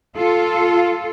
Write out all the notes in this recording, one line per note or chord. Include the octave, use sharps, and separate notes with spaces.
F4 A4